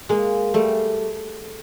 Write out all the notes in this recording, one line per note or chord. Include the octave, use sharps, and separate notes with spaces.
G#3 A#3
G3 A3